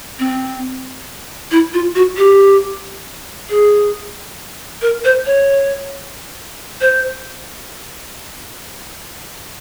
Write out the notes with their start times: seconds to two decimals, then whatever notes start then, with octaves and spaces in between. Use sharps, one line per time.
0.19 C4
1.51 E4
1.74 F4
1.95 F#4
2.17 G4
3.50 G#4
4.82 A#4
5.05 C5
5.26 C#5
6.81 C5